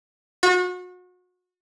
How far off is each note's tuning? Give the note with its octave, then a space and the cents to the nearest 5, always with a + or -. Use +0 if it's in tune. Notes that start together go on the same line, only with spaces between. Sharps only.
F#4 -35